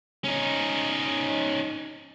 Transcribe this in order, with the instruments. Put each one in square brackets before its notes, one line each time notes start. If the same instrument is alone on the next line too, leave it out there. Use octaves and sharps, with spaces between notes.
[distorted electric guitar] C#4 D#4